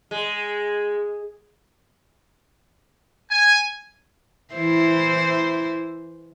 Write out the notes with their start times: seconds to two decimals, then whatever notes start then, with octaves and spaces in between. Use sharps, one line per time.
0.11 G#3
3.29 G#5
4.55 E3 E4 C5